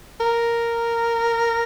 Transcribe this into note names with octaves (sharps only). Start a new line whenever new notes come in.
A#4